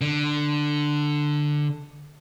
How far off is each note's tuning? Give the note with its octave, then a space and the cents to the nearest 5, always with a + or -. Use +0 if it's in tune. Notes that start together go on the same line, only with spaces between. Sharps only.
D3 +10